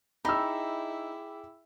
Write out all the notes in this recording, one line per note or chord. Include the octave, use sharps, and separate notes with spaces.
D#4 E4 G#4 G5 B5 D6 E6